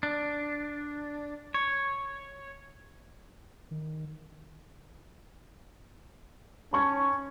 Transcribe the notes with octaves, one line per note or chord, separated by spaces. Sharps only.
D4
C#5
D#3
C#4 A5 C#6 G#6